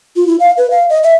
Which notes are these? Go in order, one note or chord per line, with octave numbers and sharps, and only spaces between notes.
F4
E4
F5
B4
F5
D#5
E5